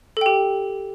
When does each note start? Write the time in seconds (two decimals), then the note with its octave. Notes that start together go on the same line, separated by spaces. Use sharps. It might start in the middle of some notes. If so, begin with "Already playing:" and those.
0.17 A4
0.21 G5
0.26 G4